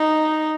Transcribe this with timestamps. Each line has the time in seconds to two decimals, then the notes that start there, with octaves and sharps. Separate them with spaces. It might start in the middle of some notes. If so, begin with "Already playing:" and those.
Already playing: D#4